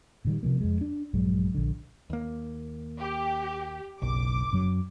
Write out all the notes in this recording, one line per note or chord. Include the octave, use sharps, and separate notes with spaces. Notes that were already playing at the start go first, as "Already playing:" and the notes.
A#2 D#3 G3
C3 F3 A#3
F2 G#3
D4
A#1 G2 F#3 G#3
A#1 D3
D#2 A#3
G4
F#1 B1 D6
F#2 F#3